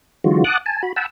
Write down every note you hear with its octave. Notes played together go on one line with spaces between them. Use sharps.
D3 E3 F#3 G#3 F4 F#4
F#5 A5 D6 D#6 F#6
G#5 A5
F#4 B5
F#5 G5 A5 B5 E6